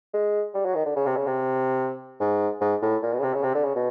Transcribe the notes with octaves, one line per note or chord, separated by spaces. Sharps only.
G#3
G3
F#3
D#3
D3
C#3
C3
C#3
C3
G#2
G#2
A2
A#2
B2
C#3
C3
C#3
C3
D3
C#3
B2